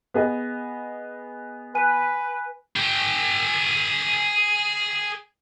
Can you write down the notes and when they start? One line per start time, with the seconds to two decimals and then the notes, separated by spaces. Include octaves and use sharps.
0.14 B3 G#4 D#5
1.75 B4 G#5 F#6 D#7
2.76 G#4 G5